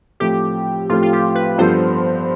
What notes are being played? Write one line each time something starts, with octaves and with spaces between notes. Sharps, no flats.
A2 F3 A3 C4 G4
A2 F3 A3 C4 F4
F4
G4
B4
G2 F3 B3 F4 A4 C5